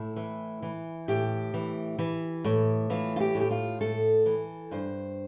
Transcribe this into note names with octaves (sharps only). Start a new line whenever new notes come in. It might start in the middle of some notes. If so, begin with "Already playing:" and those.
Already playing: A2 E4
E3
E3
A2 G4
E3
E3
A2
E3 F4
F4
G4
A2
G4
F4
A2 A4
E3
G2 C5